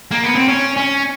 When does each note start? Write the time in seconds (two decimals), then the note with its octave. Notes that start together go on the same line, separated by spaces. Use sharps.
0.11 A#3
0.23 B3
0.35 C4
0.48 C#4
0.77 C#4